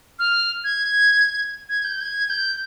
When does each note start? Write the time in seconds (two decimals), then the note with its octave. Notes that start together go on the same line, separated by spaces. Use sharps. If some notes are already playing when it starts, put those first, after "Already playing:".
0.19 F6
0.64 G#6
1.69 G#6
1.84 G6
2.01 G#6
2.30 G6